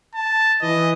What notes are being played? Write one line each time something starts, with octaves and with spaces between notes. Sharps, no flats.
A5
E3 D#5